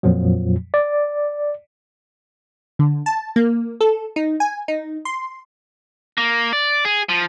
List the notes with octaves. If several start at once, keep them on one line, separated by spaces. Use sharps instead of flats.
F2 A#2 F3 F#3
D5
D3
A5
A#3
A4
D#4
G#5
D#4
C6
A#3
D5
G#4
F3